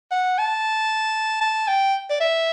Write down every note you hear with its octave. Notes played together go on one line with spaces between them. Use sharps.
F#5
A5
A5
G5
D5
E5